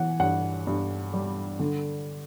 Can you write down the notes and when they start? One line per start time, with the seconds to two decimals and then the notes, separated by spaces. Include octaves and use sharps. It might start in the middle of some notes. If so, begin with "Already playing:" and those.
Already playing: E3 F#5
0.20 G2 F#5
0.67 G2
1.13 G3
1.59 D3